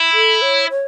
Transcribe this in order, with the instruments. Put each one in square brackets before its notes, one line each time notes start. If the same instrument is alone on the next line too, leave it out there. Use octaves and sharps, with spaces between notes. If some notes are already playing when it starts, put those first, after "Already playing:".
Already playing: [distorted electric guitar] E4
[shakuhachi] A4
C#5
C#5